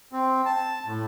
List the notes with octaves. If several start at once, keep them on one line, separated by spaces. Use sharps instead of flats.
C4
A5
A2